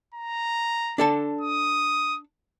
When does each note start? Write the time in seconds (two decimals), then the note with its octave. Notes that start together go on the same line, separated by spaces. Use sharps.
0.14 A#5
0.98 D4 A4 A5
1.41 D#6